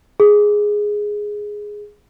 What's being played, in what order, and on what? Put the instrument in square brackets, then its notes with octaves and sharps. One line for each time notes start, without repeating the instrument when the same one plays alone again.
[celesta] G#4